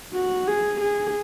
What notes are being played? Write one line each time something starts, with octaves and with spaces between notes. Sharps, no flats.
F#4
G#4
G#4